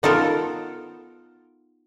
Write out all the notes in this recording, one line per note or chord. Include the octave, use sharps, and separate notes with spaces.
B3 D#4 F4 A4 A#4